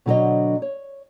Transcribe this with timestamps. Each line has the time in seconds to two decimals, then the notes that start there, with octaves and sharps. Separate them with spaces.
0.06 B2 D3 F#3 G#4 C#5 D#5
0.62 C#5